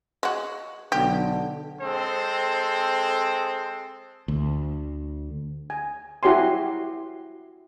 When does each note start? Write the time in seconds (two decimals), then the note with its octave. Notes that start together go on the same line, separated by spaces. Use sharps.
0.23 G#3 F#4
0.92 B1 D3 G4
1.81 G#3 C4 A4 C5
4.28 D2
5.70 G#5
6.23 E4 F#4 G4 C#5 G#5 C6